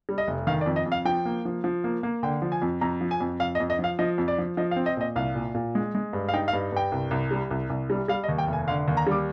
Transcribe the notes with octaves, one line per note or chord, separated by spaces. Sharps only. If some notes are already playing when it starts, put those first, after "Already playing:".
G3
D#5
F1
D#3 F5
D5
F2
D#5
F2
F5
F3 G5
A#3
F3
F3
A#3
A#3
D3 G5
F3
G#5
F2
F2 A#5
F3
G#5
F2
F2 F5
D#5
F2
D#5
F3
F5
F3 D#5
F2
D5
F3
F3 D#5
F5
C4
D#5
A#2 D#5
C2 F5
A#2
A#2
G#3
G#3
G2
F5
D#4 G5
F5
G2
G2 G5
C2
C2
G3
C2
C2
G3
G3 F5
D#5
D#2
G5
F1
G#5
D3 F5
D#2
A#5
G3 D6